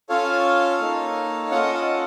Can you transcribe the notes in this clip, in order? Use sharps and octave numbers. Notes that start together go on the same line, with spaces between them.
C#4 F4 A4 C#5 F5
A#3 D#4 A4
C#4 F4 A4 D#5 F#5
D#5 F#5